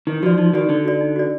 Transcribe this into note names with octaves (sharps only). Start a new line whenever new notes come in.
D#3 D#4
F3 F#4 D5
F3 D#4
D#3 F#4 D5
D3 D#4
F#4 D5
D#4
F#4 D5